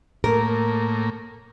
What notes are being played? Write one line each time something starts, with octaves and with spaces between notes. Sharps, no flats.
A2 A#3 A#4